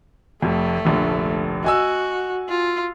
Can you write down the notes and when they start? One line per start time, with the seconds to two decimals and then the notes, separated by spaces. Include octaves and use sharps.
0.43 F1 F2 A3
0.85 F1 A#1 D3
1.64 F#4 D#5 G#5 E6
2.49 F4